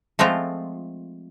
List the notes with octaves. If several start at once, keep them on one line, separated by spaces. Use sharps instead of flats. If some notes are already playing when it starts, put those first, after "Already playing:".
F3 G#3 A3 C4 F4